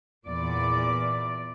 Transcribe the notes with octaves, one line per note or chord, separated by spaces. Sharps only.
E2 A#2 D5